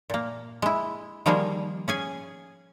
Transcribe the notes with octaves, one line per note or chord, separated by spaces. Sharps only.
A#2 A#3
G#3 E4
D#3 F3 G3 A#3 G#4
C#4 G#4 G#5